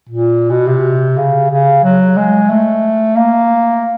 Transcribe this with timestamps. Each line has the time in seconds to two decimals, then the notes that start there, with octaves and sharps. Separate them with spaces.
0.09 A#2
0.50 B2
0.67 C3
1.17 C#3
1.51 C#3
1.84 F#3
2.17 G#3
2.50 A3
3.16 A#3